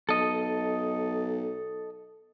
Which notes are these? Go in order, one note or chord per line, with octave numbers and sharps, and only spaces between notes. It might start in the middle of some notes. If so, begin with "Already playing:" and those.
B1 A4 D#5